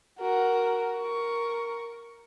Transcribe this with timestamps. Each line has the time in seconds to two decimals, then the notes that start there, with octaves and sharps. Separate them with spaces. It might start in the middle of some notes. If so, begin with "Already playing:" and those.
0.19 F#4 A#4
0.98 A#4 C#6